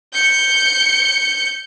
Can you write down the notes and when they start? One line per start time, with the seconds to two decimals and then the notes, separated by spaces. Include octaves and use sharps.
0.13 G6 C#7